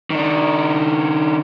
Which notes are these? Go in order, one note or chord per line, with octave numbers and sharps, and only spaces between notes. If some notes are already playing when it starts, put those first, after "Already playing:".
D#3 D4